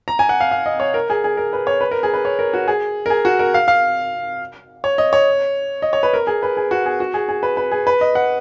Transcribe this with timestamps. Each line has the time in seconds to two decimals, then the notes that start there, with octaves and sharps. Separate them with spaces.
0.08 A#5
0.19 G#5
0.29 F#5
0.40 F5
0.51 F5
0.66 D#5
0.80 C#5
0.94 A#4
1.10 G#4
1.24 G#4
1.37 A#4
1.53 B4
1.67 C#5
1.81 B4
1.91 A#4
2.03 G#4
2.14 B4
2.25 C#5
2.39 A#4
2.54 F#4
2.68 G#4
3.06 A#4
3.10 G#4
3.25 F#4
3.39 A#4
3.54 F5
3.68 F5
4.84 C#5
4.98 D#5
5.13 C#5
5.82 D#5
5.93 C#5
6.03 B4
6.14 A#4
6.27 G#4
6.43 B4
6.57 G#4
6.71 F#4
6.86 G#4
7.00 F#4
7.14 G#4
7.29 G#4
7.43 B4
7.57 B4
7.71 G#4
7.87 B4
8.01 D#5
8.15 F#5